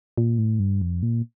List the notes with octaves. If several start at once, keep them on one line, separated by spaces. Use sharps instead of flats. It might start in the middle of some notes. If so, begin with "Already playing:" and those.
A#2
A2
G2
F2
A#2